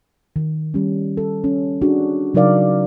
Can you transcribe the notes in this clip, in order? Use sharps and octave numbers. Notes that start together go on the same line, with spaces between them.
D#3
G3 C#4
A4
C#4
D4 F#4 G#4
C#3 F#3 D#4 A#4 D5 F5